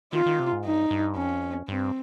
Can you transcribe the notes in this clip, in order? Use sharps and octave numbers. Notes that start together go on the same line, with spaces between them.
D#3 F4
D#3
C3
G#2
G2 D#4
G2
F2 C#4
G2 C4